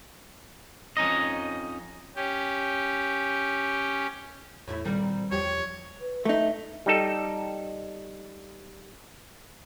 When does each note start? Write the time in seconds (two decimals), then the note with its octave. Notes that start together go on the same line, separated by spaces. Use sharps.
0.97 F2 C#4 D#4 D#5
2.16 C#4 G4
4.68 E2 A2 A3 E4
4.85 A#2 D#3 G3 C4 A#4
5.31 E2 F3 G4 C#5
6.00 B4
6.25 A3 D#4 E5
6.86 G3 D#4 A4